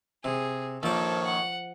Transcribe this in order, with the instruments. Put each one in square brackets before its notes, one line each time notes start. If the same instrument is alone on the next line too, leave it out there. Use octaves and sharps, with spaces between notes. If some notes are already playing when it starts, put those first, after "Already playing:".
[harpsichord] C3 [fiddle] G#4
[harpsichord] A#1 A#2 D5 [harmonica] D#3 C#5 [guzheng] F3 [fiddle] A4
[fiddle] F#5